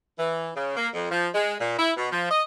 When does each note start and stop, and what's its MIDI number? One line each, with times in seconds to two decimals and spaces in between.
0.19 0.51 52
0.56 0.74 49
0.77 0.88 58
0.94 1.10 41
1.11 1.28 53
1.35 1.55 56
1.61 1.75 46
1.78 1.92 64
1.97 2.11 47
2.12 2.30 53
2.31 2.43 75